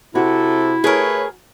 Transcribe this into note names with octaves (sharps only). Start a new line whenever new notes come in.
C3 E4 F#4 A4
A3 G#4 A#4 B4 C#5